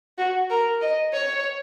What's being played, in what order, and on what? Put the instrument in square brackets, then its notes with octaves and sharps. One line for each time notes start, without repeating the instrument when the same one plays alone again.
[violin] F#4
A#4
D#5
C#5